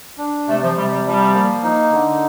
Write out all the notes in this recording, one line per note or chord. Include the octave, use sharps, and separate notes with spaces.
D4
C3 A3
F3
C3 G3
G3
F3 G3
A#3
D#4
D3